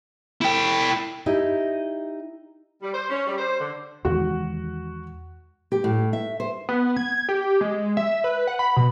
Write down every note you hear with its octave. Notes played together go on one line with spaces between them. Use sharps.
E4 G5
D#4 E4 G4 E5
G3
C5
C#4
G3
C5
D3
E2 D#3 G#3 F#4
G4
A2
E5
C5
B3
G#6
G4
G#3
E5
B4
F#5
B5
B2